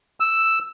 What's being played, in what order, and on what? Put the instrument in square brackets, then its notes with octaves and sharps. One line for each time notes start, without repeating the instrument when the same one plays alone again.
[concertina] E6